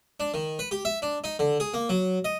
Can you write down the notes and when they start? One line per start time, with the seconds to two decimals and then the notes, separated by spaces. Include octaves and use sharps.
0.20 D4
0.34 D#3
0.59 B4
0.71 G4
0.85 E5
1.02 D4
1.24 D#4
1.39 D3
1.60 G#4
1.74 A#3
1.89 F#3
2.25 D#5